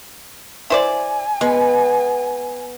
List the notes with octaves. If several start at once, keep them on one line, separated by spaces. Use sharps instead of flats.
E4 C5 D5 G#5
G#3 B3